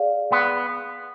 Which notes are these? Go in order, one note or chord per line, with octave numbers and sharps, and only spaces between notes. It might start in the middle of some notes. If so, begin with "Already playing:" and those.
Already playing: G#4 D5 F5
B3